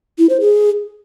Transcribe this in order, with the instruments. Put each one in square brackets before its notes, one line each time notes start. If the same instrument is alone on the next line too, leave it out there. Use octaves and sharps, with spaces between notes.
[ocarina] E4
C5
G#4